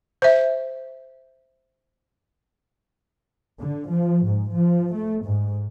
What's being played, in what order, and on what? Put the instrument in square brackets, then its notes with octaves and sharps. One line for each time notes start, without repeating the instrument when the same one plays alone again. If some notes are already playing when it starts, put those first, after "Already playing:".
[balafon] C5 E5
[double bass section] D3
F3
G#2
F3
A3
G#2